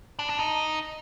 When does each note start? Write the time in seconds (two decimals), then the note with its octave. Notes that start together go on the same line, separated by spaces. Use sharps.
0.19 D4
0.29 D4
0.40 D#4